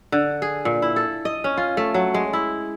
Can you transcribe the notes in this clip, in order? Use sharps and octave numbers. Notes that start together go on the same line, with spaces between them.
D3
G#4
A#2
E4
A4
D#5
C#4
F4
A3
F#3
G#3
E4